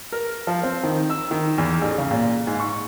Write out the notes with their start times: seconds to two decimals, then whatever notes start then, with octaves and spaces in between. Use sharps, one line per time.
0.12 A#4
0.47 F3
0.63 C4
0.83 D#3
1.10 E6
1.31 D#3
1.58 E2
1.81 A1
1.98 C#3
2.11 A#2
2.47 G#2
2.60 C#6